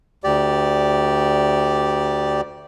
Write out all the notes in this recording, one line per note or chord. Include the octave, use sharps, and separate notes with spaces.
D2 G4 D5